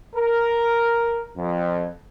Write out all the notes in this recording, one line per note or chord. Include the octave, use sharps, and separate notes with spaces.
A#4
F2